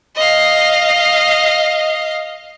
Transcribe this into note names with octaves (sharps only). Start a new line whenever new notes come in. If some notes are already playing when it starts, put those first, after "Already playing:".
D#5 F5